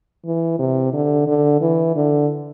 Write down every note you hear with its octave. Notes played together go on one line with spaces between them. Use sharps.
E3
C3
D3
D3
E3
D3